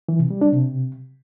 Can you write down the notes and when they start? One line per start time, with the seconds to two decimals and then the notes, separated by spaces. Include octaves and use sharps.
0.09 E3
0.19 C3
0.30 G3
0.41 D4
0.52 C3